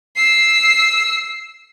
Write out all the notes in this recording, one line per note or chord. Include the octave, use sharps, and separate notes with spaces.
E6 C7